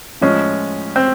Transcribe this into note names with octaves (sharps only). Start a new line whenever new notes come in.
A2 F3 G#3 C#4
C4